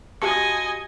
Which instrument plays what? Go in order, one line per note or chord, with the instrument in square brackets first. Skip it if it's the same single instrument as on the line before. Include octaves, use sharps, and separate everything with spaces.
[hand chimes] F#4 F5 C#7 [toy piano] G4 A5 C#6 [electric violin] D#5 G#5